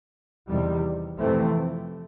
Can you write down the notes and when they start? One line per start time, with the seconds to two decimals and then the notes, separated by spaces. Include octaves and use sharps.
0.50 E2 C3 D#3 G3
1.19 F2 C3 E3 A3 C4